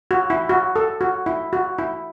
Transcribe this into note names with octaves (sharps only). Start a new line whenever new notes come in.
F#4
E4
F#4
A4
F#4
E4
F#4
E4